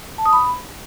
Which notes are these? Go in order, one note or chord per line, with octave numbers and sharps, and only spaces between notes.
A5
D#6
B5